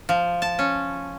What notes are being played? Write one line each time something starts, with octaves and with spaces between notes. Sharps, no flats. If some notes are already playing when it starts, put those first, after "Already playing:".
F3
A5
C#4